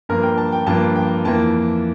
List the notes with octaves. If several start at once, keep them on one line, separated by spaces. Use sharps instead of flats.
G2 F3 A#3 A#4
G5
A5
G5
G2 F3 A#3 A5
G5
F2 E3 A#3 A5